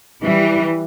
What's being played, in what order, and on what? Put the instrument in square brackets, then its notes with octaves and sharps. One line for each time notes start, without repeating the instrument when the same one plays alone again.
[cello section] E3 G3